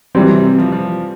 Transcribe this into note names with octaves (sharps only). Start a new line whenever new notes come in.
E3 F#3 G3 C4
C3
C3
F3
F3